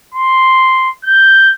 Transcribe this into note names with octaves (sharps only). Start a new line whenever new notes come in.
C6
G6